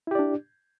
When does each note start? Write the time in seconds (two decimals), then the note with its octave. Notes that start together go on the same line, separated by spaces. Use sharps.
0.07 E4
0.11 G4
0.15 D5
0.19 D4